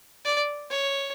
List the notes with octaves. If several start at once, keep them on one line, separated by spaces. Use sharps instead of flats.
D5
C#5